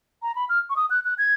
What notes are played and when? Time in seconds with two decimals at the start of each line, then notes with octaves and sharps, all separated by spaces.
0.22 A#5
0.36 B5
0.49 F6
0.70 C#6
0.76 D#6
0.90 F#6
1.05 F#6
1.18 G#6